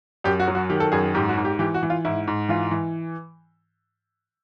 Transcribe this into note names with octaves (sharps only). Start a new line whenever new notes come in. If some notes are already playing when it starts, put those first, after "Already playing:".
F#2 G4
F#4
F#3
F#4
D#3 G4
A4
F#2 G#4
G#4
G#2 G4
F#4
G#2
G4
E3 G4
F#4
E3
F4
G#2 E4
G#2
E3 F4
E3